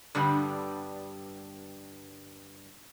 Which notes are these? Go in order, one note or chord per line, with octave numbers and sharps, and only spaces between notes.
G2 D3 G3 B3